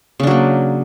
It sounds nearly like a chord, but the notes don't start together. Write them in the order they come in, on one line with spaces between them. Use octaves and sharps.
C#3 D4 F#3 A#3